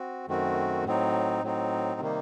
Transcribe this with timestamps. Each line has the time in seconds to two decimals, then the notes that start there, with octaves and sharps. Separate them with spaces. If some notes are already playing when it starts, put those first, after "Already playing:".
Already playing: C4 F#4
0.28 F#2 D#3 A3 C4 F#4
0.85 A2 F#3 C4 D#4
1.43 A2 F#3 C4 D#4
2.00 C3 D#3 G3 A#3 D#4